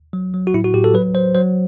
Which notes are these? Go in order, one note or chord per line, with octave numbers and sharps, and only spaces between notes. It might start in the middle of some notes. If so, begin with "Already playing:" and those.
F#3
F#3
F#4
A2 E4
F#4
A2 G4
A4
F#3 B4
F#3 C5
F#3 C5